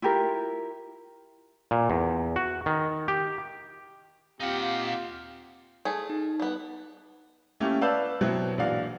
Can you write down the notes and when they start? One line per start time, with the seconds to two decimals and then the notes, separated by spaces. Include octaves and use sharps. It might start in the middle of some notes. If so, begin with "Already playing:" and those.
0.02 E4 F4 G4 A#4
1.71 A#2
1.90 E2
2.36 F#4
2.66 D#3
3.08 G4
4.40 D#2 C4 D#4 F4 G4 F5 F#5
5.85 A3 G#4
6.09 D#4
6.40 G3 B3
7.60 A3 A#3 C#4 E4 G4
7.81 B4 D5 F5 A5 E6 G6
8.21 B2 F#3 B3 C4 E4
8.58 A#1 E3 D4 F#4 F5